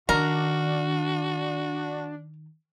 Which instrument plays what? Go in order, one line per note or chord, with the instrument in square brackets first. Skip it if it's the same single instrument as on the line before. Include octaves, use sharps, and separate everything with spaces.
[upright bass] D#3 [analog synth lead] D4 [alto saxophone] F#4 [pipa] A#4